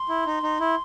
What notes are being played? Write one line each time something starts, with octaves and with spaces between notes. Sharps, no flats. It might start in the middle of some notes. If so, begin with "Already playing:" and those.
Already playing: C6
E4
D#4
D#4
E4